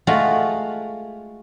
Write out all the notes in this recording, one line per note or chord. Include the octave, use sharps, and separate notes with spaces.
G#3 A3 F4 F#4